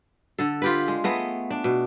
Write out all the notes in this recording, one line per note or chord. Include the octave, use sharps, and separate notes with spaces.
D3 A4
F4 G4 B4
G#3
A3 B3 G#4 D#5
D4
B2